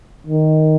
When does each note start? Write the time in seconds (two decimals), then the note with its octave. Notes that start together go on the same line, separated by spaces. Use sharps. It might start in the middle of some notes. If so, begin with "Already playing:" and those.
0.27 D#3